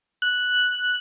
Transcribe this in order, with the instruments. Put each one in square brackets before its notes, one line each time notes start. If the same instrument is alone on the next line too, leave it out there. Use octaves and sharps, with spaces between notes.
[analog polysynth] F#6